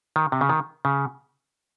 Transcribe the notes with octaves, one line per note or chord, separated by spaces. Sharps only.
D#3
C3
C#3
D#3
C#3